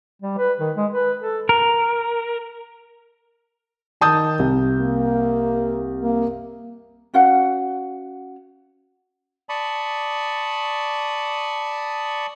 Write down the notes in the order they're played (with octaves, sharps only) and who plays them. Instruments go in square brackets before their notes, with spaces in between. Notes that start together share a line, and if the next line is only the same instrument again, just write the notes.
[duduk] G3
B4
D#3
G#3
B4
A4
[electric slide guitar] A#4
[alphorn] D#3 [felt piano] A5 D#6 G6
[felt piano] C2
[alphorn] A#3
A#3
[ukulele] C#4 F#4 F5 F#5
[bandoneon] D5 A5 B5 C#6 D#6